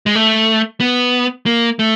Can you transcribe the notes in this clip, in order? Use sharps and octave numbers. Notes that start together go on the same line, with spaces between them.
G#3
A3
B3
A#3
A3